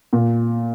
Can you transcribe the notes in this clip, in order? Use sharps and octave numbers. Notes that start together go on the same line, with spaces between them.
A#2